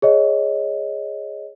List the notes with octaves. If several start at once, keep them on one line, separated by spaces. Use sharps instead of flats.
G#4 C#5 D#5